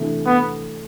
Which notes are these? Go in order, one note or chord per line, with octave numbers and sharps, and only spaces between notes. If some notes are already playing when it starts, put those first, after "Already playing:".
Already playing: C3 E3 A3 D4
B3